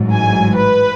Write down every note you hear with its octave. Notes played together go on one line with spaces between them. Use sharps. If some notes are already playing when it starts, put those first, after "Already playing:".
Already playing: A1 G#2 F#3
G#5
B4